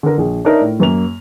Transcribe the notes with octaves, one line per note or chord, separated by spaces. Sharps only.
D3 A#4
A#1 G#4
D4 D#4 A#4 C#5 D5 E5
A2
F#2 A#3 F7